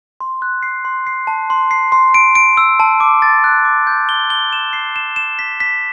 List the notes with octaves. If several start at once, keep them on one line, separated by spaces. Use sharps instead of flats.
C6
F#6
C7
C6
C7
A5
C6
C7
C6
D7
D7
E6
A5
D6
A6
F#6
D6
G6
G7
G7
E7
C7
E7
E7
B6
B6